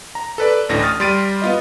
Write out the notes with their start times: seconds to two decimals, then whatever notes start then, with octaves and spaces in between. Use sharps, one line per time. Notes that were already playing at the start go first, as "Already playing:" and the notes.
0.15 A#5
0.38 A4 B4 D5
0.69 A1 D2 A2 D4 A#6
0.83 D#6 F6 A6
1.00 G3 C6 A6 D7 D#7
1.42 B3 F4 D#5